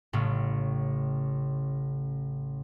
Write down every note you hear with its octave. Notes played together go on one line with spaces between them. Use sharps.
A1 A2 C#3